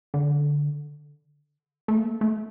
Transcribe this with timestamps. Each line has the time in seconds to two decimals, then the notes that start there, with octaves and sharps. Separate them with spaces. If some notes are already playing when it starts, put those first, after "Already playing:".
0.14 D3
1.88 A3
1.98 A#3
2.21 A3